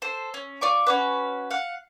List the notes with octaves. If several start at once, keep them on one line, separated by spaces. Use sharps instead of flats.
A4 C5
C#4
F4 D5 C#6 D6
C#4 F#4 B4
F5 F#5